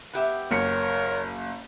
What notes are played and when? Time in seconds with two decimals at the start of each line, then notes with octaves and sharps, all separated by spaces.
0.13 B3 G4 E5
0.51 F#1 A#4 C#5 C#7